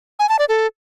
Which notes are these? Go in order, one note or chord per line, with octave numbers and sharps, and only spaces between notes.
G#5
A5
D5
A4